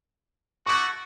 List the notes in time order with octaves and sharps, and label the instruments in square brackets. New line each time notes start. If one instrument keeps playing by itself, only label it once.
[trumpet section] A3 E4 F#4 [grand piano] C#6 D6 F#6